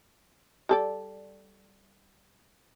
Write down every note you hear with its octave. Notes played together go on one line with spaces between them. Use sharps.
G3 A4 D5